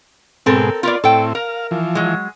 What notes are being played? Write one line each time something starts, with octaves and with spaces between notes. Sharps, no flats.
G#2 B2 G#3 C4 A4 A#4
B3 F4 A#4 D5 F5
A2 C4 E4 A4 G5
A#4 F5
E3 F3
F#3 G#3